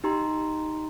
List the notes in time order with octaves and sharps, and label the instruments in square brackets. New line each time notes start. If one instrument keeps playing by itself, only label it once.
[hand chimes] D#4 G4 A#5 C6